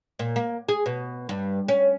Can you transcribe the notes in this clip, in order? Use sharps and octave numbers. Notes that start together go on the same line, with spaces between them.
A#2
A#3
G#4
B2
G2
C#4